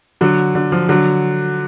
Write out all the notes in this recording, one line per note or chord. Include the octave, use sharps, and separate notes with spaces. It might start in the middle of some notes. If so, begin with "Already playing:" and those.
D3 F#3
D3
F3
D3 F#3